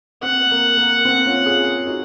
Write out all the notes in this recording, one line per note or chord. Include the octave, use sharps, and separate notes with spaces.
C4 F#5
A#3
A#3
C4
C#4 F4
F4 G#4
D#4 F#4